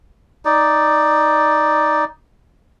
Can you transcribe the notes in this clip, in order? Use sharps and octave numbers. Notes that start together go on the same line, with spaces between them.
D#4 D5